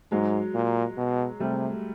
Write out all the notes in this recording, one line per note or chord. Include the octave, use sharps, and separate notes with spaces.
G#2 F#3 G#3
A#2
B2
C3 G3 A3